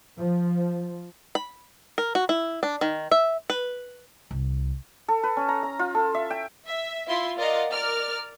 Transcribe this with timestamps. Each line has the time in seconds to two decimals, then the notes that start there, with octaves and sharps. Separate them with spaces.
0.18 F3
1.35 B5
1.98 A#4
2.15 F#4
2.29 E4
2.63 D4
2.81 D#3
3.11 E5
3.50 B4
4.31 C2
5.08 A4
5.23 B4
5.37 C#4
5.49 A#5
5.63 A#5
5.79 F4
5.95 A4
6.15 E5
6.30 G5
6.67 E5
7.08 E4 F4 E5 C6
7.37 F4 A#4 D5 D#5 F5 F#5
7.70 A#4 D5 F6